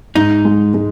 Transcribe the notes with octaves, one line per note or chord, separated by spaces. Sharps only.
G#2 D#4
G#3
G#3